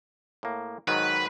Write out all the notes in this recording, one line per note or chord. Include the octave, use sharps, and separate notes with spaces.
A2 A#3
G#2 D#3 F#3 B4